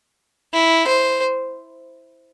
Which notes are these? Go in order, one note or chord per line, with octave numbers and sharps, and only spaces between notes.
E4
C5